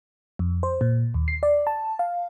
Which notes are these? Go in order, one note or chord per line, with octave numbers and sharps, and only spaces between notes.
F2
C5
A#2
D#2
C7
D5
A5
F5